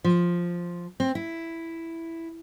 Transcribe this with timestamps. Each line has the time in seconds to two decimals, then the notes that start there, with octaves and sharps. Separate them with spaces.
0.04 F3
1.00 C4
1.15 E4